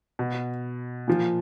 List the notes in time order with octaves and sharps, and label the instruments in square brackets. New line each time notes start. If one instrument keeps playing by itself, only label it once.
[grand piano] B2
A#2 F3